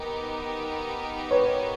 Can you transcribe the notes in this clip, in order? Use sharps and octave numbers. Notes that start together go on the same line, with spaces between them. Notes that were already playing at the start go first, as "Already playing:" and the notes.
Already playing: B3 D#4 G4 A#4
B4 C#5